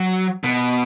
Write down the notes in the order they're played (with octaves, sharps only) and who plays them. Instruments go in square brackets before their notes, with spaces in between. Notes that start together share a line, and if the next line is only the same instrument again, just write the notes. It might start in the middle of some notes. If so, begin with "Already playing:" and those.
Already playing: [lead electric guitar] F#3
B2